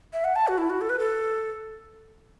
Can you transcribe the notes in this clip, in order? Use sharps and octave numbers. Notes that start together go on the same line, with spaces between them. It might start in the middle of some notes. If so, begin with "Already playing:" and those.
E5
F#5
A5
F#4
E4
F#4
A4
B4
A4